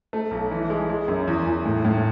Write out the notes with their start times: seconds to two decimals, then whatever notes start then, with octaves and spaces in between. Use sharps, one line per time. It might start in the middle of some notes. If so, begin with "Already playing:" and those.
0.13 A3
0.31 B1
0.51 E3
0.70 G#3
0.89 G#3
1.08 F#2
1.27 E2
1.47 E2
1.66 A2
1.85 A2